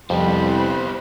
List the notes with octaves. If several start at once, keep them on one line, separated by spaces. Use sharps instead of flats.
C2 F2 G3 B3 C5 B5